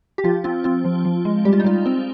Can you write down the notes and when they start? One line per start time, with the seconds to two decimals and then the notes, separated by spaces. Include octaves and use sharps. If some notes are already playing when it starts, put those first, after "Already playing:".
0.18 G4
0.24 F3 F4
0.44 C4 F4
0.64 C4 F4
0.85 F3
1.05 F3
1.25 G#3
1.45 G3 G4
1.53 F4
1.60 D#4
1.64 G3 F4
1.86 C4